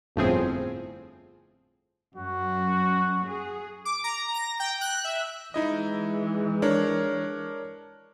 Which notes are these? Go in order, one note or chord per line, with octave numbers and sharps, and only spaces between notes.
G1 F2 A2 F3 C4 G#4
F#2 F#4
G#4
D6
A#5
A#6
G5
F#6
E5
E3 G#3 D#4 E4 D#5
D4 A#4 C#5